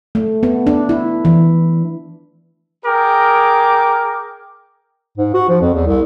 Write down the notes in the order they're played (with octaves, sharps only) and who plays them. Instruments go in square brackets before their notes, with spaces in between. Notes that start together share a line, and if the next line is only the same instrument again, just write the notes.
[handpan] A3
B3
D4
E4
E3
[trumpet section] G#4 A#4 G5 D6
[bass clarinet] G#2
F#4
F3
F2
E2
C2